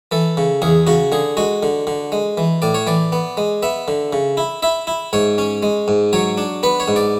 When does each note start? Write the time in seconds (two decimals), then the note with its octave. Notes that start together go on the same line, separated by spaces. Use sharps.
0.12 E3 A4
0.37 C#3
0.62 E2 G#4
0.87 C#3 F#4
1.12 D3 G#4
1.37 G#3 F#4
1.63 D3
1.87 D3
2.12 G#3
2.38 E3
2.62 A2 D5
2.74 C#5
2.87 E3 D5
3.12 B3
3.37 G#3
3.63 B3 E5
3.88 D3
4.13 C#3
4.37 E4
4.62 E4 E5
4.87 E4
5.13 G#2 C#5
5.38 C#4
5.63 G#3
5.88 G#2
6.13 F#3 C#5
6.38 D4
6.63 B3 B4
6.80 C#5
6.88 G#2
6.96 D5